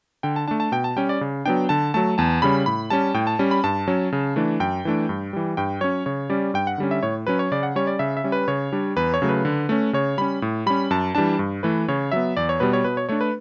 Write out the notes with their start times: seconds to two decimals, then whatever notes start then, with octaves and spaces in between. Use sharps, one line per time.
0.23 D3 G5
0.36 A5
0.48 A3 D4 A5
0.60 A5
0.72 B2 G5
0.84 A5
0.96 G3 C#4 G5
1.09 D5
1.21 C#3
1.46 F#3 B3 D4 G5
1.69 D3 A5
1.94 F#3 A3 A5
2.18 E2 A5
2.42 C#3 G3 C#4 B5
2.66 A2 B5
2.90 G3 C#4 A5
3.14 A2 G5
3.27 A5
3.39 G3 C#4
3.51 B5
3.64 G2 A5
3.88 F#3 C#4
4.12 C#3
4.36 E3 A3 D4
4.60 F#2 G5
4.85 E3 A3 D4
5.09 G2
5.33 E3 G3
5.57 G2 G5
5.81 F#3 C#4 C#5
6.06 C#3 C#5
6.30 G3 C#4 D5
6.54 G2 G5
6.67 F#5
6.78 D3 G3 C#4
6.91 E5
7.03 A2 C#5
7.27 F#3 C#4 B4
7.39 C#5
7.52 C#3 D5
7.63 F#5
7.76 G3 C#4 C#5
7.87 D5
7.99 C#3 E5
8.17 E5
8.24 G3 C#4
8.32 B4
8.48 C#3 C#5
8.72 G3 D4
8.96 E2 B4
9.14 C#5
9.22 C#3 F#3 A3
9.29 B4
9.45 D3
9.69 A3 C#4
9.93 C#3 C#5
10.18 G3 C#4 B5
10.42 A2
10.66 G3 C#4 B5
10.91 F#2 A5
11.15 E3 G3 D4 A5
11.39 G2
11.63 E3 A3 B4
11.88 C#3 C#5
12.12 F#3 B3 E5
12.37 E2 D5
12.49 C#5
12.60 B2 G3 B3 B4
12.73 C#5
12.84 B2 B4
12.97 C#5
13.09 A3 D4 C#5
13.21 B4